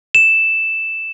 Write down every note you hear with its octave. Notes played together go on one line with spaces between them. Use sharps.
E7